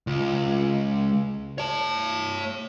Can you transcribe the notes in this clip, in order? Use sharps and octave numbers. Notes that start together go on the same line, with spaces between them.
C#2
C#5 A5